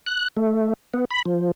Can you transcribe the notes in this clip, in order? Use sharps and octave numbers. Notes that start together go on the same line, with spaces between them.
F#6
A3
B3
B5
F3